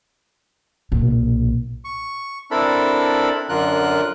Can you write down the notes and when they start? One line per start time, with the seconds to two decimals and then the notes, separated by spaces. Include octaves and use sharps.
0.92 B1 A#2
1.85 C#6
2.51 C4 D4 E4 A4 A#4 B5
3.49 F#2 D3 F4 A#4 F#6